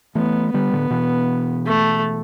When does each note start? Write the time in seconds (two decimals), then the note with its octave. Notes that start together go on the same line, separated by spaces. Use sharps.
0.15 E3 A3 B3
0.53 D3 G3 B3
0.72 A2 D3
0.90 B2 E3
1.66 A3